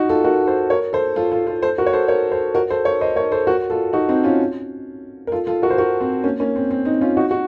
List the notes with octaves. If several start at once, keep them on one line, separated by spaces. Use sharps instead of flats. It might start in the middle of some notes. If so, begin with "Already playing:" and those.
Already playing: D#4 F#4
F4 A4
F#4 A#4
A4 C5
A#4 C#5
A4 C5
F4 A4
F4 A4
F4 A4
A4 C5
F#4 A#4
C#5
A4 C5
A#4 C#5
A4 C5
F#4 A#4
A4 C5
A#4 C#5
C5 D#5
A#4 C#5
A4 C5
F#4 A#4
F4 A4
D#4 F#4
C4 D#4
C#4 F4
A#4
F4 A4
F4 A4
F#4 A#4
C5
F#4 A#4
C4
A#3 C#4
A#3 C#4
C4
C4
C4 D#4
C#4 F4
D#4 F#4
F#4